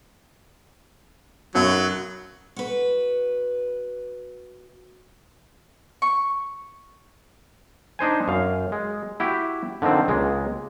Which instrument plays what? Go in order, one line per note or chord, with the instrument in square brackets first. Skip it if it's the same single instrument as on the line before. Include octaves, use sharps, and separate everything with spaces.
[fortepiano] B1 F#2 C#5 [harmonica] F#3
[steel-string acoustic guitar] F#4 B4
[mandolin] C#6
[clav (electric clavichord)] D4 D#4 C5 G#5
F#2 F5
G#3
E4 F#4 G4
D3 D#3 F3 C4
C#2 G#3 A#3